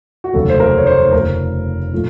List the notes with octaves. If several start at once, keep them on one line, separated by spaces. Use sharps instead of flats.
F#4
F1 D#2 C#3 F#3 A3 A4
C5
A#4
C#5
C5
F1 F2 C#3 A#4
A#2 F3 A3